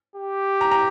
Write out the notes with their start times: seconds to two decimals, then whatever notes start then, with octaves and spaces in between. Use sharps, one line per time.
0.16 G4
0.61 A#5
0.71 A#5